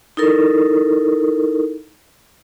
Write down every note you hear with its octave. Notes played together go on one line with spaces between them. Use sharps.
D#4 E4 A4 A#4